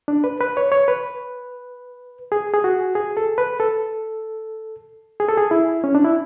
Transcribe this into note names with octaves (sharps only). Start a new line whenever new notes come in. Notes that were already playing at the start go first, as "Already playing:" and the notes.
D4
B4
B4
C#5
C#5
B4
G#4
G#4
F#4
G#4
A4
B4
A4
G#4
A4
G#4
E4
C#4
D4
E4